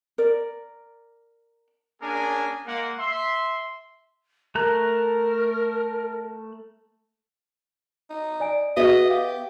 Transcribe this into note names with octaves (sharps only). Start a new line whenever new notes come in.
A#4 D5
A#3 C#4 D4 G#4 A#4 G#5
G#3 A#3 F#5
E5 C6
A3 A#4 A#5 F#6
D#4
D5 G#5 D7
B3 F#4 G#4 D#5 E5
G4 F5